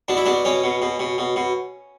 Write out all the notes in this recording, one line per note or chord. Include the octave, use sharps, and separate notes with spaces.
B2 D4
E4
B2 D4
B2 C#4
B2
B2
B2
B2
B2